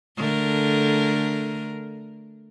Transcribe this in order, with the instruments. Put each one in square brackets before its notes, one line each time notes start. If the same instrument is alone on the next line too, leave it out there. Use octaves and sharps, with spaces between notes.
[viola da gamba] D3 A3 A#4